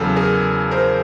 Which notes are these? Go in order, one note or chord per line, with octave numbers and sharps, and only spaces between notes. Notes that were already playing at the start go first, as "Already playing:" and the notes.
Already playing: E2 C#3 F#3 A4
G#4 A#4
A#4 C5